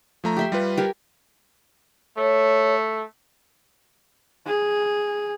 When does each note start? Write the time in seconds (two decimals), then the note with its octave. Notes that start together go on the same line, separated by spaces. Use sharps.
0.24 F3 A3 A#5
0.37 G4 E5 C6
0.52 G3 F4 B4
0.78 G4 A#4 G#5
2.18 A3 C#5
4.47 G#4